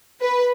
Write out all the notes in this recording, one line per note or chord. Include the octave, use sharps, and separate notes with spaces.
B4